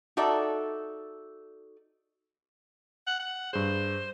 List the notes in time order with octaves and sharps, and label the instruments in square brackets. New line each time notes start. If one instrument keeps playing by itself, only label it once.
[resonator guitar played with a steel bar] D#4 F#4 A4 D5 E5
[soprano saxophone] F#5
F#5
[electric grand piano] G2 G#4 [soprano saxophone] C5